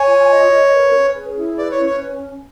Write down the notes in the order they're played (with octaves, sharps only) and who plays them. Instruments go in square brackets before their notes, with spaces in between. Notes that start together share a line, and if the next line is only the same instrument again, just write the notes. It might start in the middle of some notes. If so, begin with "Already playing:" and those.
Already playing: [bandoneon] C#5 [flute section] G#5
[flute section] F4
D#5
A#4
B4
C#4
G#4
E4
[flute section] B4 [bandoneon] D5
[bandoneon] C#5
[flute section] C#4
[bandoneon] C#5